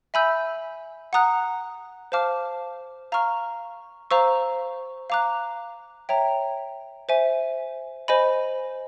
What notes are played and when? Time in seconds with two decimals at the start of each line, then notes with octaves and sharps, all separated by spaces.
0.14 E5 G#5 B5 E6 G6
1.13 F#5 A#5 D#6 F#6
2.12 C5 F5 A5 D6 F6
3.12 F5 A#5 C#6 F6
4.11 C5 F5 A#5 C#6 E6
5.10 F5 A#5 D6 F#6
6.09 C#5 E5 G5 A#5
7.09 C5 E5 G#5
8.08 C5 D#5 G#5 B5